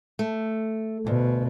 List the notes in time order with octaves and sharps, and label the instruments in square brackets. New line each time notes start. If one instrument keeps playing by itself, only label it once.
[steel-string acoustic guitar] A3
[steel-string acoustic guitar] D2 [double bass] B2